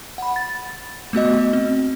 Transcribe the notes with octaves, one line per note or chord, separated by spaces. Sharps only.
F#5 B5
A6
A3 B3 F#4 D#5
C4